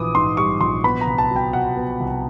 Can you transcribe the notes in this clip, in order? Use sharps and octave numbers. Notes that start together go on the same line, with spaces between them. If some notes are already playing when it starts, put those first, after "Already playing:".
Already playing: A#1 E3 D6 D#6
G#2 C6
G3 C#6
A#1 C6
B3 B5
A#5
C2
A5
F#3
G5
B2 F#5
B3
C2